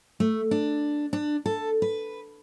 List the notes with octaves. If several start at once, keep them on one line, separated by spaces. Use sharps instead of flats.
A3
D4
D4
A4
B4